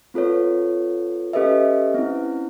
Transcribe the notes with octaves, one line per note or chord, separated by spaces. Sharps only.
C4 F4 A4 B4 C#5
C#4 G4 A4 B4 D#5 E5
C4 C#4 E4